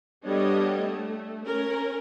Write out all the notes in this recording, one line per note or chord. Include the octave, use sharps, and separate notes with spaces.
G3 B3 D4 A4 C#5 D#5
A3
C#4 A#4